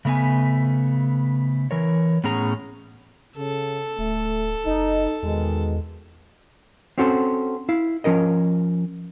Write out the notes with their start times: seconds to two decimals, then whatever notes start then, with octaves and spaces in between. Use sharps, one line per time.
0.05 C#3 A3 B3 E5 G#5
1.71 E3 A#4 C#5
2.24 A2 B3 C#4 G#4 A#5
3.37 C#3 A4
3.99 D1 A3
4.66 F#1 D#4
5.23 E2 B2 D#3 G#3
6.98 C4 C#4 F#4 A4 C5
7.69 E4 F5
8.04 F3 C#4 A#4 D#5